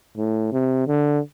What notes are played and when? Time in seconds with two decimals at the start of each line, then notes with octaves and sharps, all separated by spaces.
0.17 A2
0.53 C3
0.87 D3